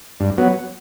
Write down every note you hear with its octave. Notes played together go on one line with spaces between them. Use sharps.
G2
F#3 B3